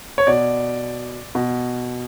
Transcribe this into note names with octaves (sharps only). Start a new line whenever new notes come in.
C#5
B2 D5
B2